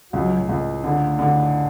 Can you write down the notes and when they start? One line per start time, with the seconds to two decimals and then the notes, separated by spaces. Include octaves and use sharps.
0.13 C#2 F#3
0.48 C#2 A2
0.84 D3
1.19 D3